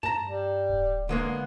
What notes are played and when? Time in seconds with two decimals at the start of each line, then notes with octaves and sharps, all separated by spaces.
0.03 G2 A5 A#5
0.26 G3
0.69 D1
1.09 D3 G#3 A#3 B3